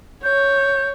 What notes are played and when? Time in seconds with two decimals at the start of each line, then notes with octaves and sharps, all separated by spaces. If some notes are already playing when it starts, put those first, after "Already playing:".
0.24 C#5 G6